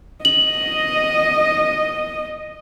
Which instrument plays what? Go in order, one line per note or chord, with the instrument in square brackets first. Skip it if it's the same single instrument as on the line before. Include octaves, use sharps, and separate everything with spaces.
[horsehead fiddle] D#5 [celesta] F#7